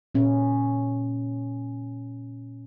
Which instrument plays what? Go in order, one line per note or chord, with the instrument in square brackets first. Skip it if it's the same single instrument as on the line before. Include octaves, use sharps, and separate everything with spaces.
[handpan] A#2 C#4